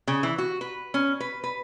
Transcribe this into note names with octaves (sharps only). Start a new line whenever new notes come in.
C#3
E3
F#4
B4
C#4
B4
B4